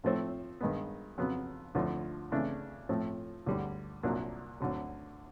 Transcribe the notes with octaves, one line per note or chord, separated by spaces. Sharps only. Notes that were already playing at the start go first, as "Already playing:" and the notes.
A2 F3 A3 C4
G2 D#3 G#3 B3
F2 C#3 F#3 B3
D2 D3 F3 A3
C#3 E3 A3 D4
A2 F3 A3 C4
D2 D3 G3
C2 A#2 F#3 A#3 D4
D2 D3 F#3